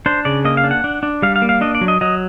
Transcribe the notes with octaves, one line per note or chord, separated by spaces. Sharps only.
D4 C5
C#3 D5
A#3 D#5
F5
D4
F#5
D4
D4
G3 F5
F5
A#3
F5
D4 D#5
D5
F#3
D#5
F#3 D#5